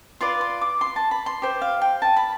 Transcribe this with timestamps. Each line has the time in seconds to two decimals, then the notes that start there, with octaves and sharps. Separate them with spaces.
0.21 F4 B4 D5 C6
0.41 C6
0.61 D6
0.81 C6
0.96 A5
1.11 B5
1.26 C6
1.42 G4 C5
1.62 F5
1.82 G5
2.02 A5
2.17 B5